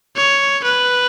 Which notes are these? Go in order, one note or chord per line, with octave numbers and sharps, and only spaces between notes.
C#5
B4